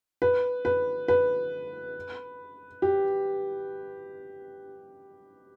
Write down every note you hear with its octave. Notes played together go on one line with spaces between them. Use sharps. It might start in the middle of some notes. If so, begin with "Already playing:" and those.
B4
B4
B4
G4